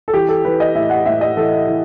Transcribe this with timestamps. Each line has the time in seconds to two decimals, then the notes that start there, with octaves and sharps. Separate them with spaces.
0.08 A4
0.13 E3 G4
0.29 A4
0.45 E3 B4
0.60 D#5
0.75 A2 E5
0.90 F#5
1.06 A2 E5
1.21 D#5
1.36 E3 A4
1.67 E3